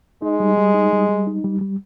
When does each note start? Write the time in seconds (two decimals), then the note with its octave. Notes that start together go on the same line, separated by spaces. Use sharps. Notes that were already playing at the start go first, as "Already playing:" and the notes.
0.22 G#3 D#4
0.40 G3
0.57 G3
0.74 D#4
0.92 G3
1.09 G3
1.27 D#4
1.44 G3
1.61 G3